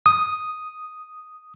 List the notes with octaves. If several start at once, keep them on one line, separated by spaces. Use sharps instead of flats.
D#6